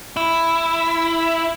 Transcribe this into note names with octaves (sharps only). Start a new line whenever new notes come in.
E4